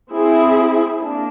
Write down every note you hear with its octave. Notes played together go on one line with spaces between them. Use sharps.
C4 E4 G#4
A#3 D4